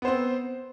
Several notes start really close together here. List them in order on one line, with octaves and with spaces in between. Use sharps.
B3 C5 C4